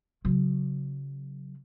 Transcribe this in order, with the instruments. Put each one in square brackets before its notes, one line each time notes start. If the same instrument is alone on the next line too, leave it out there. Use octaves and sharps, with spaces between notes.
[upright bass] C#3 F#3